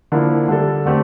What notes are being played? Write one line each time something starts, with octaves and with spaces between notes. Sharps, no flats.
D3 F3 A#3 E4
D3 G3 D4 A4
D3 A3 C4 G4